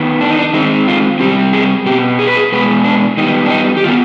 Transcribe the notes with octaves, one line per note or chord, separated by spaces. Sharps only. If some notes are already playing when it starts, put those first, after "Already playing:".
Already playing: D#3 B3
D4
D#4
D4
D#3 G#3 C4 D#4
F4
C3 G3 C4 G4
G#4
B2 B3 G4
G#4
B4
G#4
B2 G#3 B3 B4
D4
D#3 G3 B3 D#4
D4
D#4
G4
D#3 B3 F4